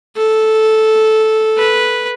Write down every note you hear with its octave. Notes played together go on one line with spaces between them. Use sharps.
A4
B4